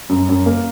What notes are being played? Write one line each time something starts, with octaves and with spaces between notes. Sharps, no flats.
F#2
F#2
A#3